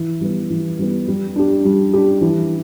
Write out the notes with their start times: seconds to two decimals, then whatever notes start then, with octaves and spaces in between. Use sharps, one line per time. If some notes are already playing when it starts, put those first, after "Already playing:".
Already playing: E3
0.21 G3 B3
0.50 E3
0.79 G3 B3
1.08 G3
1.36 D4 G4
1.65 G3
1.93 D4 G4
2.21 E3